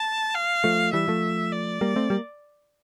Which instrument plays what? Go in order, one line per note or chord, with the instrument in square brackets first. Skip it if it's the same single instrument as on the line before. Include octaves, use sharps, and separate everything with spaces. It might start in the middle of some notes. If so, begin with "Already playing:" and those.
Already playing: [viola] A5
F5
[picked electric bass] F3 A3
[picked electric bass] E3 G3 [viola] E5
[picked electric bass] F3 A3
[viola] D5
[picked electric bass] G3 A#3
A3 C4
G3 A#3